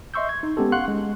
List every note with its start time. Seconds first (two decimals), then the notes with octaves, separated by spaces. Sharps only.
0.14 D#5 E5 C6 C#6 E6 G6
0.29 G#6
0.43 D#4
0.57 G#3 B3 C#4 G4 A4
0.72 F5 F#5 C6 C#6 F#6
0.88 G#3